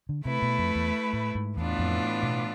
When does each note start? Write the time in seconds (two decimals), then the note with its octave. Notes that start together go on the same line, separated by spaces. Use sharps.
0.09 D3
0.25 C3 A3 E4 B4
0.42 B2
0.58 F2
0.75 E2
1.13 A2
1.35 G#2
1.57 E2 A2 E3 B3 D4 F4
1.79 F2
2.23 B2